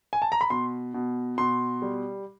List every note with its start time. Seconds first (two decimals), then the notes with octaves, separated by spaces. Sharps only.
0.13 G#5
0.22 A5
0.32 A#5
0.41 B5
0.50 B2 C6
0.94 B2
1.38 B2 C6
1.82 G3